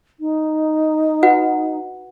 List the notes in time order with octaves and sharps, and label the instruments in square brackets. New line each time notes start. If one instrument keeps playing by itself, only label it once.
[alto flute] D#4
[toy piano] F#4 B4 F#5